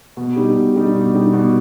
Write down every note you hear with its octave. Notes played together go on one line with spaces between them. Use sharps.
B2
G3 D#4 G4
B2
G3 D#4 G4
B2
G3 D#4 G4
B2